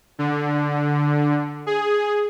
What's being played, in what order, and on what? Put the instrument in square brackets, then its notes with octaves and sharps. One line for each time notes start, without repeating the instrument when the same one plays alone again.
[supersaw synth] D3
G#4